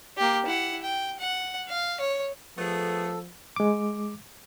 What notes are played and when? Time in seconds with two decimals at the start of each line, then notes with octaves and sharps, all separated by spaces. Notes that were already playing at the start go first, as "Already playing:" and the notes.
0.17 A#3 G4
0.46 E4 F#5
0.83 G5
1.20 F#5
1.68 F5
2.00 C#5
2.58 F3 A3 B3 G#4 A4
3.56 G#3 D6